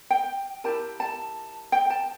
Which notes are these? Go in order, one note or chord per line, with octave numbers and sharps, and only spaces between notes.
G5
E4 G4 A#4 A5
A5
G5
A5